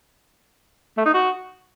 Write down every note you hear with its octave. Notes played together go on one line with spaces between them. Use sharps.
A3
D#4
F#4